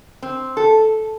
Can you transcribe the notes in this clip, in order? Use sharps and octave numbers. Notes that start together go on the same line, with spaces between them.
C4
A4